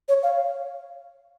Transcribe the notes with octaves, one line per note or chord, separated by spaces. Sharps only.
C#5
F5